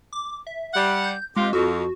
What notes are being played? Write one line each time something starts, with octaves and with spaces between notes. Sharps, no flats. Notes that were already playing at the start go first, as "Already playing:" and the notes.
D6
E5
G3 F#5
G6
G#3 C4 F4 G4
F2 F#4